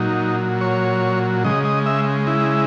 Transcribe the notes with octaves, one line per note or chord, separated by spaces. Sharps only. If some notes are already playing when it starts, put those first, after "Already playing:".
Already playing: A#2 F#3 D#4
C#5
C#3 G#3 D#5
D#5
E5
E4